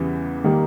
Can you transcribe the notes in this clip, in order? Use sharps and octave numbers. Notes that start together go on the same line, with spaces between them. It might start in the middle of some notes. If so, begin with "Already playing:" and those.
Already playing: E2 C#3 E3 G3 B3
D#3 G3 A#3